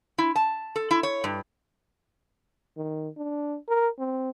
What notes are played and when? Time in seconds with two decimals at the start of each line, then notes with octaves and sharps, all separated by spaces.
0.18 E4
0.36 A5
0.76 A4
0.91 E4
1.03 C#5
1.24 G2
2.77 D#3
3.17 D4
3.68 A#4
3.99 C4